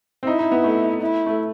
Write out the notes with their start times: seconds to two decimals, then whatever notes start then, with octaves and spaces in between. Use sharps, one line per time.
0.23 C4
0.27 D#4 E4
0.39 D#4
0.52 B3
0.64 A3
1.01 E4
1.26 A3